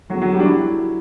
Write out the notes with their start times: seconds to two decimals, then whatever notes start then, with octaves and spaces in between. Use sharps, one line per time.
0.10 E2 D3 F#3 A3 F#4
0.21 F#3 F#4
0.33 G3 G4
0.40 D4
0.45 F#3 A3 E4